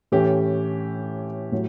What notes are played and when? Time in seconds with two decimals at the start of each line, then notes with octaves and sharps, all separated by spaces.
0.12 A2 E3 A3 C#4 G4
1.52 A2 F#3